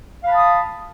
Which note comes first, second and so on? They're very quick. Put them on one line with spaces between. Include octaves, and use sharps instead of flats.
F5 B5 A5 D#6